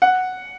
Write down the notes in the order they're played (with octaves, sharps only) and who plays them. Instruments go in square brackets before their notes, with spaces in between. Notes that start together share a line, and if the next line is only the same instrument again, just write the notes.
[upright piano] F#5